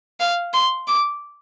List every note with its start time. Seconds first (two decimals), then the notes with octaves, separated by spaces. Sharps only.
0.20 F5
0.54 C6
0.87 D6